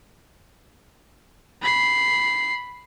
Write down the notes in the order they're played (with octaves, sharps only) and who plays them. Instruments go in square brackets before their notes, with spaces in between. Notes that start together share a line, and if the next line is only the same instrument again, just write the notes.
[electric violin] B5 C7